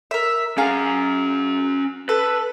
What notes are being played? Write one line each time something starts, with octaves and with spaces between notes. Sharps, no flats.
A#4 E5
C#4 G#4 F5 F#5 A#5
A4 B4